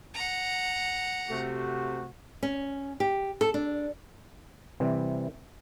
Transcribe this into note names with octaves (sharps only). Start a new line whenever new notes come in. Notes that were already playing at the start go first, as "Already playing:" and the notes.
F#5 A#5
C3 A3 F#4
C#4
G4
A4
D4
C3 E3 G3 C4